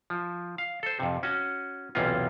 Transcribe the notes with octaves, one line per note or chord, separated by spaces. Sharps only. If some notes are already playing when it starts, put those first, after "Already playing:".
F3
F5
A4 C5
F2 C3
C#4 F#4
B1 E2 C3 E3 C#4 F4